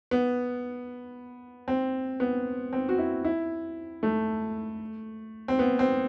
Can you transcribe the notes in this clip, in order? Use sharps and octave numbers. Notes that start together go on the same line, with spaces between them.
B3
C4
B3
C4
F#4
E4
E4
A3
C4
B3
C4